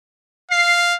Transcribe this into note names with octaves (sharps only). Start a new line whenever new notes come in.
F5 C7